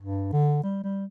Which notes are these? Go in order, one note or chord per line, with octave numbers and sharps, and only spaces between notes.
G2
D3
G3
G3